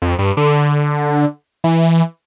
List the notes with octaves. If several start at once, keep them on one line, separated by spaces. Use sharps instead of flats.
F2
G2
D3
E3